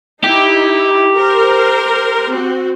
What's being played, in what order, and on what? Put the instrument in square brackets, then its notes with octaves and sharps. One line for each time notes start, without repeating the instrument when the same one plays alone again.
[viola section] D#4 E4 [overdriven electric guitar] G4
[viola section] A#4 C5
C4 F#4